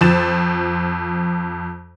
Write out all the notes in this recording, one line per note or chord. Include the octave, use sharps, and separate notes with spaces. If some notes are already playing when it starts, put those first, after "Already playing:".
F2 F3 C5 A6 E7